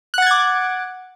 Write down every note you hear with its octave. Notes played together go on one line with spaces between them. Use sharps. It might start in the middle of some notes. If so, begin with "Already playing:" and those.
F#5 D6 F#6 G#6 A6